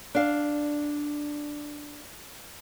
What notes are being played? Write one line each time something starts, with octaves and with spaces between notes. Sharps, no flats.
D4 F5